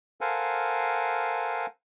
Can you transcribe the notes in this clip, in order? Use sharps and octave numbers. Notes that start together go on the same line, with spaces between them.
A4 A#4 C5 F5 F#5 G#5